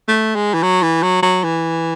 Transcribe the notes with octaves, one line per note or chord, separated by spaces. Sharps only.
A3
G#3
E3
F#3
E3
F#3
F#3
E3